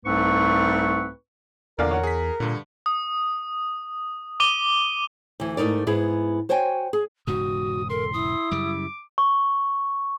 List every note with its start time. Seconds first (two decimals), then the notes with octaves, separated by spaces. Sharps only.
0.06 C2 G#2 A3 C4 B4 C#6
1.79 E2 A#2 D3 A#4 D5 F5
1.91 C#5 F#5
2.04 G#4 B6
2.40 G2 A#2 D3
2.86 D#6
4.40 D6 D#7 G7
5.40 D2 E3
5.57 G#2 A3 D#4 A#4 D5
5.87 G#2 B3 E4 G#4
6.49 F#4 C5 C#5 G5 G#5
6.93 G#4
7.27 E1 G#2 C#3 F#4 D#6
7.90 A4 A#4 C6
8.13 E4 D#6
8.51 F#2 C#3 G3 D6
9.18 C#6